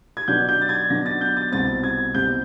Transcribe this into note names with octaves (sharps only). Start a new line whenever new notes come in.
G#6
B2 F#3 B3 D4 G6
G6
A6
G#6
B2 F#3 B3 D4 A#6
A6
G6
A6
C2 B2 G3 C4 A6
G#6
C2 B2 G3 C4 G6